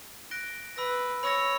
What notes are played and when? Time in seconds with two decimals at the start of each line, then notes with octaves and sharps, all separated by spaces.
0.31 F#6 A#6 D7 G7
0.76 B4 B5 E6 A#6
1.23 C#5 B5 E6 A#6